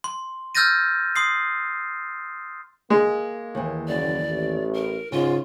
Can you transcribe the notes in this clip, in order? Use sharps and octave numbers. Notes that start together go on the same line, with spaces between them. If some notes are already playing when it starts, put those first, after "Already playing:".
C6
E6 F6 G6 A6 A#6 D#7
C6 D#6 C7
G#3 A#3
D#2 E3
F#1 D5
A1
A#4
G#2 C#3 F4